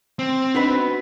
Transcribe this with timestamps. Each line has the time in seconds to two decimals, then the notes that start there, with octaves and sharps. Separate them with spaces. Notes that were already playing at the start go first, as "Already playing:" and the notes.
0.19 C4
0.55 B3 D4 D#4 F#4 B4